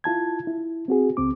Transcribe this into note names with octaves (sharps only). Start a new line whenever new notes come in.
E4 F4 A5 G#6
E4
C4 F#4 G#4
C#2 C4 D6